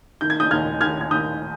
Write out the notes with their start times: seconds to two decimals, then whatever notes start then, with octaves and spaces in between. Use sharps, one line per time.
0.21 D#3 G6
0.30 G#6
0.40 D#6 G6
0.51 D#2 F6 G#6
0.81 D#2 F6 G#6
1.01 G#6
1.11 D#2 D#6 G6